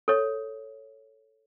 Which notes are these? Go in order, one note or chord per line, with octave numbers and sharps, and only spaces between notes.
A4 C#5